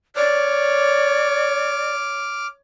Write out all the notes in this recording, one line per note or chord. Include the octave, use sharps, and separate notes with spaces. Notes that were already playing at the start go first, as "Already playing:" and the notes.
C#5 D5 D6 F6